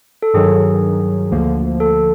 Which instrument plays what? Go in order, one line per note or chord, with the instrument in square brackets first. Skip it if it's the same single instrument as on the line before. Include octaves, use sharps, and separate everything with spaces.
[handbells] A4
[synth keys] G2 D#3 F#3 [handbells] G#4
[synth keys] D2 D3 F3 A#3
[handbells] A4